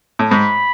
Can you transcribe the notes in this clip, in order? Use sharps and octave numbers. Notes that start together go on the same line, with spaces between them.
A2
G#2 B5